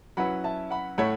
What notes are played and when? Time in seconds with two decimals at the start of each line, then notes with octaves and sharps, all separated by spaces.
0.17 F#3 C#4 E4 B4 F#5 B5
0.44 E5 A5
0.70 F#5 B5
0.98 A2 A3 E4 C#5 F#5 B5